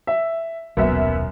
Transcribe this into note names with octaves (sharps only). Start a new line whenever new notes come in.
E5
D#1 B1 F#2 A#3 B3 E5